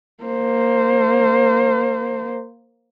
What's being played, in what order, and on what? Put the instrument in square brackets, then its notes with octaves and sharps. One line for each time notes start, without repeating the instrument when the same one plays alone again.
[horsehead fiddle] A#3 C5